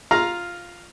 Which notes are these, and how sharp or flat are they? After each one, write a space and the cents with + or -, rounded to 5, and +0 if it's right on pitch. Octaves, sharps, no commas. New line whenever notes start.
F4 +0 F5 +0 A#5 +5